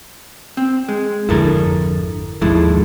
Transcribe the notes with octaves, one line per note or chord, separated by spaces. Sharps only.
C4
G#3
G#1 F2 D3 E4 A4 A#4
D#2 G#2 F3 G#3 E4 A4